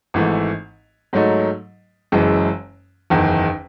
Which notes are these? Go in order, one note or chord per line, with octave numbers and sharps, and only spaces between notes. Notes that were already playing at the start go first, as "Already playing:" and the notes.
G#1 G#2 E3 A3
G#2 F#3 A3 D#4
F#1 F#2 E3 G#3
F#1 E2 D#3